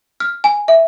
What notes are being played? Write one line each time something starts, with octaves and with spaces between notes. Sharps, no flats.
F6
G#5
E5